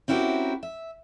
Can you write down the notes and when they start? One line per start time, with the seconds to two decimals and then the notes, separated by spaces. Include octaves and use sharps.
0.08 C4 C#4 E4 F#4 G4 A#4
0.63 E5